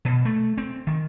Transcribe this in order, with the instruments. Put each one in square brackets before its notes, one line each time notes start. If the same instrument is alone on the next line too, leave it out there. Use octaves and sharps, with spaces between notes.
[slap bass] B2
A3
C4
D#3